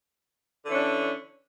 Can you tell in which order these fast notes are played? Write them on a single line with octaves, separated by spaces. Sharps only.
D3 E3 C#4 D4